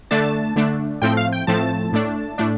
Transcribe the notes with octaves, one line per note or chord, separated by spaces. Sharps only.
D3 A3 D4 A5
D3 A3 D4
A2 F3 A3 C4 G5
F5
G5
A2 F3 A3 C4 A5
A2 A3 D4
A2 A3 D4